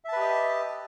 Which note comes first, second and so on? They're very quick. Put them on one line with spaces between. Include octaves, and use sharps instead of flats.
E5 A5 B4 G4 D#5